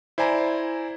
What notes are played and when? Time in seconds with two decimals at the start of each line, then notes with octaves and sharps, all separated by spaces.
0.18 E4 C5 D5 G#5 A#5